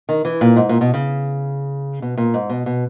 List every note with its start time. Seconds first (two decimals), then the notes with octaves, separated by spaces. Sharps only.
0.09 D#3
0.25 E3
0.41 A#2
0.56 G#2
0.69 A#2
0.81 B2
0.94 C#3
2.02 B2
2.18 A#2
2.34 G#2
2.50 B2
2.66 B2